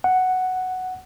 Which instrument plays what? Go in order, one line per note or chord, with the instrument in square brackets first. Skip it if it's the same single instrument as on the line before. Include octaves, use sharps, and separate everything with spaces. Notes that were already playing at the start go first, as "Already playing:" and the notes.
[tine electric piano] F#5